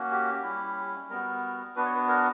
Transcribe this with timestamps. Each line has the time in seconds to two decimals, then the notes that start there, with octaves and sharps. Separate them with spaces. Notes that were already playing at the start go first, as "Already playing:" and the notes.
Already playing: A#3 C#4 F#4
0.11 G4
0.43 G3 C#4 E4
1.09 G3 B3 F#4 A#4
1.76 B3 D4 F#4 B4
1.85 C#5
1.95 B4
2.08 A#4